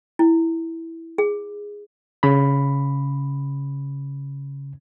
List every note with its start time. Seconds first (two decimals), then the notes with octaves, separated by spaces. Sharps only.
0.19 E4
1.18 G#4
2.23 C#3 B5